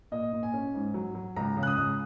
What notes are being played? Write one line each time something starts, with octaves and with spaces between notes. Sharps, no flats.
A#2 D#5
A#2
G#5
C#4
G#2
F#3
F#3
C#2 A#5
C#3
F#6
D#6
C#2